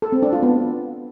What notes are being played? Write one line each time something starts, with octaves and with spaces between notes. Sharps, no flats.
A4
C4
D4
F4
B3